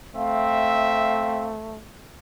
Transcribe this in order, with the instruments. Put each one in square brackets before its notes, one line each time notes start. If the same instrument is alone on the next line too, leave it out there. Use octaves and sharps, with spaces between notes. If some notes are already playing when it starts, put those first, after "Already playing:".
[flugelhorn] A3 [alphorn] C4 [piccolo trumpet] E5 [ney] F5